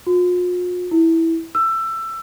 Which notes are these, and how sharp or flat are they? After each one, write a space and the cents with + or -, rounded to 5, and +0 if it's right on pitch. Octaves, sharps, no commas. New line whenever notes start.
F4 +45
E4 -5
E6 +20